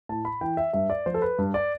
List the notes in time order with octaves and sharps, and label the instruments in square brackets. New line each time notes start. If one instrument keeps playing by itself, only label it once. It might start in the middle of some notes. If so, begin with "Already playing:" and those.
[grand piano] A2 A5
B5
E3 G5
E5
G2 E5
D5
F3 C5
A4
B4
G2
D5